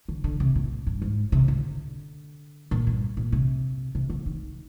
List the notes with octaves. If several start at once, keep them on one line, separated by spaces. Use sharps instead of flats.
D3
D3
C3
A#2
G2
G#2
C3
D3
A#2
G2
A#2
C3
C3
D3
D#3